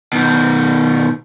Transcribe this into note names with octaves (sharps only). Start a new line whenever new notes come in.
B2 D#3